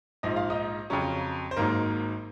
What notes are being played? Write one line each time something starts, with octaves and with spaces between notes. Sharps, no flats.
A#1 G#2 F3 D#5
F5
D#4 D#5
F2 C#3 F#3 C#4 C#5
C5
G#1 G#2 F#3 A#3 A#4